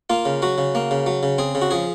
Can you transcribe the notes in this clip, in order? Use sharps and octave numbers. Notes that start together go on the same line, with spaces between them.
A#3 F4
C#3
F#3 F#4
C#3
A#3
C#3
F#3
C#3
C4 G#4
C#3
F#4
F3 G#4